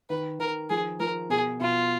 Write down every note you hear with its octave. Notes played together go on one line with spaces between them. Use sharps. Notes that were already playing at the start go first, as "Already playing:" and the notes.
D#3 B4
D#3 A#4
F3 G#4
F3 A#4
B2 G#4
B2 F4